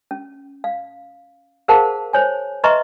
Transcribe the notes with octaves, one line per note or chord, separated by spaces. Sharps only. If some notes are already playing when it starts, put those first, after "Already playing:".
C#4
F5
G#4 A#4 C5 F5 F#5 A5
C5 C#5 G#5
B4 D#5 E5 A#5 C6 C#6